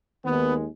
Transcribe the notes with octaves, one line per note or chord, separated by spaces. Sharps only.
D#2 D#3 G#3 B3